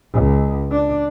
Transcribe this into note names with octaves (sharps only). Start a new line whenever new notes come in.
C#2
D4